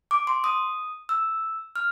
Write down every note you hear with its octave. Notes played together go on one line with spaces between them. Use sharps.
D6
C6
D#6
E6
F6